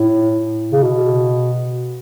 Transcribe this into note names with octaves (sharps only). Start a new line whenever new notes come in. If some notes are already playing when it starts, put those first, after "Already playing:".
Already playing: A2
C#3
B2